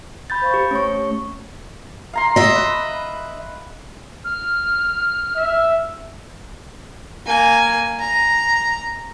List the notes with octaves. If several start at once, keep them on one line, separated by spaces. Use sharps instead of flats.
B5 G6 A6
C5 F5 C#6
G4
A3 C#4 C#5 C#6
F5 A#5 C6
D#5 E5
B4
F6
E5
A#3 G#5
A#5